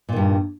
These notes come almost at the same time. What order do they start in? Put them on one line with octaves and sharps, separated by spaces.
A#2 D#3 G2